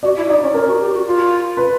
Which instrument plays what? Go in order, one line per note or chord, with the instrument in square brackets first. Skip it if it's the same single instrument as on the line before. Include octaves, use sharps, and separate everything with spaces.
[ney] F#4 [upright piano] D5
[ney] E4
[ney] D#4 [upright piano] D5
[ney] C#4
[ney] C#4 [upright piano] A#4
[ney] F#4
G4
F#4
F4
[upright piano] B4